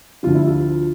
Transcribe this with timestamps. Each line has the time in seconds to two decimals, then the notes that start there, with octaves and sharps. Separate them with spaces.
0.23 D2 D3 F3 F4
0.35 E4
0.47 F4